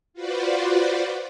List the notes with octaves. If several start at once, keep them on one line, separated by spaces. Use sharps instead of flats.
F4 F#4 B4 C5 D5